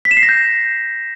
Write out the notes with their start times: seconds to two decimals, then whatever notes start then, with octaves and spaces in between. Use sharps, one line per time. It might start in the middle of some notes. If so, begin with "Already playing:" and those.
0.05 B6
0.11 E7
0.17 C7
0.23 A#6
0.29 G6